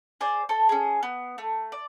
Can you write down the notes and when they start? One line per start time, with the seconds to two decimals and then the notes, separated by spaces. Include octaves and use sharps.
0.21 G#4 C5 D5
0.49 A4 C5
0.69 C#4 G#4
1.03 B3
1.38 A3
1.72 D5